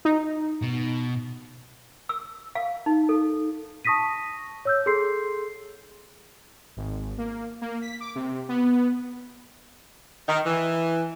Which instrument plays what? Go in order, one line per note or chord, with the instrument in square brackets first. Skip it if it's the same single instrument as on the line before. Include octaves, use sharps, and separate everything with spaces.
[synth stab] D#4
[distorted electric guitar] B2
[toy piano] E6
F5
D#4
A4
[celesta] A5 C#6 D#6 A#6 B6 D#7
C#5 E6 G6
G#4 A4 C6 C7
[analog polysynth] G#1
A#3
A#3
B6
D6
C3
B3
[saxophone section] D#3
E3